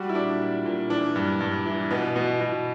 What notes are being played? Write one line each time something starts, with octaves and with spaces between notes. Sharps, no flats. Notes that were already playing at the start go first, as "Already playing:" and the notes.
Already playing: G3 F#4
E4
A#2 D4
A#2
A#2
E3 D4
G2
G2
E3
B2 B3
B2
B2